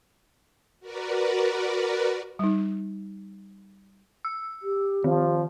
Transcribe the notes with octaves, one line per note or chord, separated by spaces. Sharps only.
F#4 A#4 B4 D5
G3 D#4
E6
G4
D#3 F3